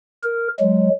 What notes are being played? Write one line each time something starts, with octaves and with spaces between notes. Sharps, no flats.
A#4
F#3 G#3